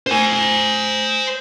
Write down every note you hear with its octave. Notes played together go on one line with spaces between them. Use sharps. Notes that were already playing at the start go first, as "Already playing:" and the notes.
C5 G#5